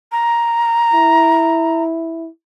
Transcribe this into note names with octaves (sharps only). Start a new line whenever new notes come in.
A#5
E4